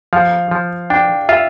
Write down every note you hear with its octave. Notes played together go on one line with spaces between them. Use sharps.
F3 F5
F3
D4 G5
F4 E5